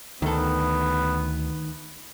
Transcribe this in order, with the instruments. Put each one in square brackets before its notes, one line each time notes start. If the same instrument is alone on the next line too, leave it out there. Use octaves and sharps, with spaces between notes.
[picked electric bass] D2 [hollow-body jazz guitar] D#3 A4 [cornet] B3